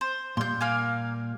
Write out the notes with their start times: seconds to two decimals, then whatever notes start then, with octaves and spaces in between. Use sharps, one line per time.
0.01 C5
0.37 A#2 G3 C6 G6
0.61 A#3 F5 G#5